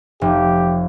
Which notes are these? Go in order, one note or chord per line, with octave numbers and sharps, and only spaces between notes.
F1 G4